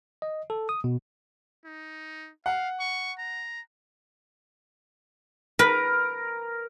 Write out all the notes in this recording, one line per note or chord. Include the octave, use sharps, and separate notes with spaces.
D#5
A4
D#6
B2
D#4
F5 F#5
C#6
A#5
A#4 B4